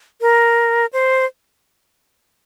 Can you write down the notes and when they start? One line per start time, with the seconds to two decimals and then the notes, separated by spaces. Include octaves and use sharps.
0.21 A#4
0.93 C5